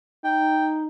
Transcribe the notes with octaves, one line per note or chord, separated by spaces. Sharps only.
D#4 G5